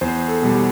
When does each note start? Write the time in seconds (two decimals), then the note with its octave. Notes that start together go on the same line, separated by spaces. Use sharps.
0.01 E2 C5
0.28 A4
0.42 B2 G3
0.55 G4